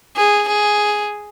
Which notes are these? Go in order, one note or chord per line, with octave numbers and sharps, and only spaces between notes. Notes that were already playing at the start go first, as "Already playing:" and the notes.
G#4
G#4